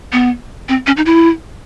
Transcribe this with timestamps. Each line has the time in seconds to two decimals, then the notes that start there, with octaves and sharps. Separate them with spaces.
0.12 B3
0.69 C4
0.87 C#4
0.97 D#4
1.06 E4